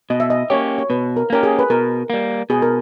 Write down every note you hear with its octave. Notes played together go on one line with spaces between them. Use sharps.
B2 D#5
E5
D#5
A#3 C#4 G4 C#5
C#5
B2 B4
A#4
A#3 C#4 G4 A#4
G#4
B4
B2 A#4
G3 A#3
B2 G#4
A#4